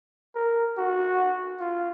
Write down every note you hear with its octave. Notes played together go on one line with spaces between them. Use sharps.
A#4
F#4
F4